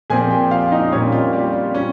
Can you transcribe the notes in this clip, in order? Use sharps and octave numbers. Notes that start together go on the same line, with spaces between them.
A#2 F3 C4 G#4 G#5
G4 G5
F4 F5
D#4 D#5
A#2 G3 C4 C#4 C#5
F4
G3 G4
F4
G3 C#4